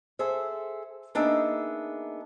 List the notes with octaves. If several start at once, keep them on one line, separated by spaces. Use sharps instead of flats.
G#4 A4 C5 E5
A#3 B3 D4 D#4 G#4 E5